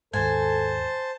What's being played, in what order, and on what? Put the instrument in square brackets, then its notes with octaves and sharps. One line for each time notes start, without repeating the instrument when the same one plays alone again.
[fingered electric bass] D#2 G#2 [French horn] A4 [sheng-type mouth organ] C5 A5 [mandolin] G#5